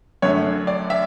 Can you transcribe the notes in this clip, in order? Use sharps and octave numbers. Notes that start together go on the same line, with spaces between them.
F#2 D3 A3 C#5
D5
E5